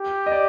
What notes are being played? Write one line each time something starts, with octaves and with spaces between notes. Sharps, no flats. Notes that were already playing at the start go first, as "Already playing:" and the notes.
Already playing: G4
D#5
D5